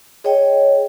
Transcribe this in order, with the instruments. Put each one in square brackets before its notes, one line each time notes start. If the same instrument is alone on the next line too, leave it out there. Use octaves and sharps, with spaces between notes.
[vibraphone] G#4 C#5 D#5 G5